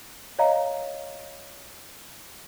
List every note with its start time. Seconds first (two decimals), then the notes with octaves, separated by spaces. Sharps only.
0.39 C#5 D#5 F5 A#5